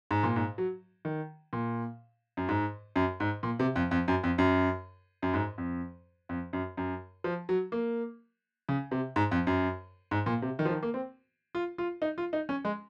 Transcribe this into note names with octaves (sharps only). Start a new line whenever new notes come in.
G#2
A#2
G#2
F#3
D#3
A#2
F#2
G#2
F#2
G#2
A#2
C3
F2
F2
F#2
F2
F#2
F#2
G#2
F2
F2
F#2
F#2
F3
F#3
A#3
C#3
C3
G#2
F2
F#2
G#2
A#2
C3
D#3
F3
D#3
A#3
C4
F4
F4
D#4
F4
D#4
C#4
G#3